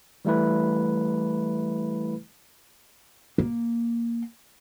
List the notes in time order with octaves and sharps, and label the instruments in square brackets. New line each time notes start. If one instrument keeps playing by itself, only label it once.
[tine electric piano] E3 G3 A3 E4 B4
[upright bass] A#3